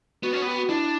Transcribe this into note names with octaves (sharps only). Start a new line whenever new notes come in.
B3 F#4
C#4
B3 G4
F#4
D4 E4